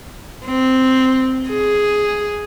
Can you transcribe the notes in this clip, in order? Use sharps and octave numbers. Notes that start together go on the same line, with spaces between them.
C4
G#4